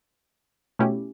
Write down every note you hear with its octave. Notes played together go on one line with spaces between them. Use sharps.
B2 A3 C#4 E4 G4